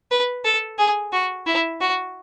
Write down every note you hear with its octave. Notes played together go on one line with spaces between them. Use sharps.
B4
A4
G#4
F#4
E4
F#4